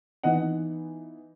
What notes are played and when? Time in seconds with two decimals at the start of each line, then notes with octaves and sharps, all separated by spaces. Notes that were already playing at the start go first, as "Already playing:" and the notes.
0.23 E3 B3 D#4 D#5 F#5